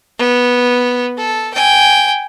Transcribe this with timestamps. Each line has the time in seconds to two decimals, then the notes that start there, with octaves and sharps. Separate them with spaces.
0.19 B3
1.18 A4
1.54 G5 G#5